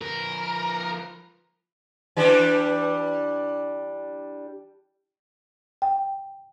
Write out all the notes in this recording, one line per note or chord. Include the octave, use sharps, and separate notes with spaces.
F3 A#4 B4
E3 G3 D4
G5